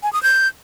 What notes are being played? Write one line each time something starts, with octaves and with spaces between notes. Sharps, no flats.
G#5
D#6
G6